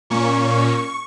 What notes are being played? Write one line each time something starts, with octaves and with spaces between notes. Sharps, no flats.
A#2 A#3 C#4 C#6
C#6